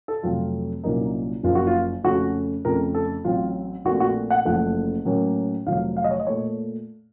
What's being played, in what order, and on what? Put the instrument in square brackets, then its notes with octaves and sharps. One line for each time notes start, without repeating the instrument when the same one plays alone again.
[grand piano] A4
F2 C3 F#3 A3 C4 F4
C2 A#2 F#3 A#3 C#4 D#4
F#1 F#2 C#3 F3 A#3 F4
F#4
F4
F2 C#3 A3 C#4 F#4
F2 C#3 A3 C4 A#4
A4
A1 A2 F#3 C4 F4
A#1 A#2 A3 C4 F#4
F#4
F#5
F#1 F#2 F3 A3 F#5
A2 F#3 A#3 C#4
F1 F2 D#3 F#3 F5
F5
D#5
C#5
D#5
A#2 A3 C#5